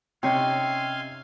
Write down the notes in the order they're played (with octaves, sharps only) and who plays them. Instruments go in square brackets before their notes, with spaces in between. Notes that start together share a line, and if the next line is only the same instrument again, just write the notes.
[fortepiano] C3 [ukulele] C#4 D#4 C#5 [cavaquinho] G4 [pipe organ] F5 G#5 C6